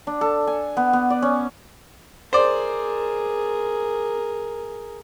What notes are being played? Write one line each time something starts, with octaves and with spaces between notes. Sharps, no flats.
D4
A4
G#5
B3
B3
D5
C#4
G#4 A#4 C5 D5